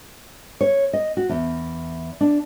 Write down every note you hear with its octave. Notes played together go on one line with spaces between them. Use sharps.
C#5
D#5
F#4
E2
D4